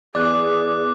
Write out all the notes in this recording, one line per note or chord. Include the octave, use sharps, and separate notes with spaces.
E2 G#4 D5 D6 F#6